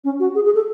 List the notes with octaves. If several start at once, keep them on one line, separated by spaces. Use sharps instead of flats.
C#4
F#4
G#4
G#4
A4